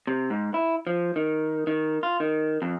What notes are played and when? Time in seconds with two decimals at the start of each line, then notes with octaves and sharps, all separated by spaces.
0.07 C3
0.30 G#2
0.54 E4
0.87 F3
1.16 D#3
1.67 D#3
2.03 F4
2.20 D#3
2.62 F2